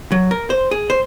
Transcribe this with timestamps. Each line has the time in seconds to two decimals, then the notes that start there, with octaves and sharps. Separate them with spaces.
0.12 F#3
0.31 A#4
0.50 C5
0.71 G#4
0.90 C5